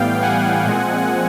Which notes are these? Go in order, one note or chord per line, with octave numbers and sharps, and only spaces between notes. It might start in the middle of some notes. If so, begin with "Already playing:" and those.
Already playing: A2 E3 G3 B3 F5 G5
F#5 G#5
A#2 F3 G#3 C4